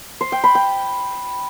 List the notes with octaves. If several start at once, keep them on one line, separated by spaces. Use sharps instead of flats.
C5
G5
B5
G5